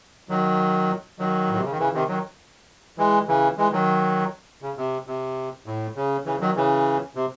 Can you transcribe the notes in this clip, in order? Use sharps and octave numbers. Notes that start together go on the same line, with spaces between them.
D#3 F#3
D#3 F#3
A2
C3
C#3
D#3
C#3 E3
C3 D#3
D#3 F#3
E3 G#3
C#3 E3
E3 G#3
D#3 F#3
C#3
C3
C3
A2
C#3
C#3 E3
D#3 F#3
C#3 E3
C3